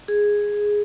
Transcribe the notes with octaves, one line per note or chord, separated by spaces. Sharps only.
G#4